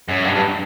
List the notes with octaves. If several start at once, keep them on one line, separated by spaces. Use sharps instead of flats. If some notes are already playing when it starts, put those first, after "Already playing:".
F#2
G2
G2